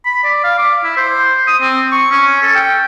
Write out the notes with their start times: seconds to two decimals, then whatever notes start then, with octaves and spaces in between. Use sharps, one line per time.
0.05 B5
0.24 D5
0.44 F5
0.58 D6
0.84 E4
0.97 C5
1.47 D#6
1.62 C4
1.92 C#6
2.11 C#4
2.43 A4
2.55 G5